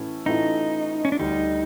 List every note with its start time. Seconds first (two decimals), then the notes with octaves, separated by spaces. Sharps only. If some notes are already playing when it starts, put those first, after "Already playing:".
Already playing: A2 E3 A3 C#4 E4
0.26 A2 E3 A3 C#4 D#4 F4
1.05 C#4
1.12 D4
1.19 D2 D3 G3 D#4